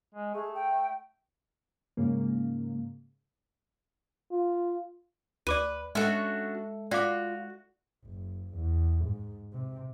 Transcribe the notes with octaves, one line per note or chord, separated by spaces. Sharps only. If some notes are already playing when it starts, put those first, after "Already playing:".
G#3
A3 G#4
G5
G#2 C#3 A#3
F4
D2 B4 D5 D6 D#7
G#3 C#4 D4 F#4 A4 E5
F4 F#4 D5 F5 D6
F#1
E2
G#2
C3